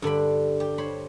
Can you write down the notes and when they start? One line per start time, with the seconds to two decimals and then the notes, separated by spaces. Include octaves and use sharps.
0.02 G2 D3 D4 B5
0.60 G4
0.78 C5 C#5 B5